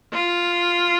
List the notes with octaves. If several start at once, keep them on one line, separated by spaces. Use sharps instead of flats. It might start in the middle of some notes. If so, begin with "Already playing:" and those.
F4